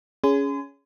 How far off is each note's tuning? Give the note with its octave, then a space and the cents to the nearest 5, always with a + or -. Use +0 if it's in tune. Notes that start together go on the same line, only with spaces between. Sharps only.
C#4 +15 G#4 +0 C6 -35